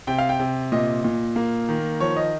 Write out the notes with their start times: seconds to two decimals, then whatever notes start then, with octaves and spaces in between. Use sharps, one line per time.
0.07 C3 G5
0.18 F5
0.29 G5
0.40 C3
0.72 A#2 D#5
1.04 A#2
1.36 A#3
1.69 D#3
2.00 F3 C#5
2.16 D#5